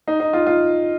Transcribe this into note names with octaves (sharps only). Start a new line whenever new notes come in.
D#4
D#4
F4
F4